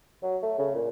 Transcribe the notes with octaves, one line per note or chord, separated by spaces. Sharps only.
F#3
A3
C#3
A#2